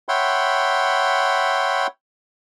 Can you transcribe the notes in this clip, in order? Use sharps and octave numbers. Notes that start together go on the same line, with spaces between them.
C#5 E5 F#5 G5 B5 C6